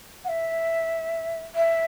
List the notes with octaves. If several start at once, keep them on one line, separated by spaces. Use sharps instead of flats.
F#5
E5
E5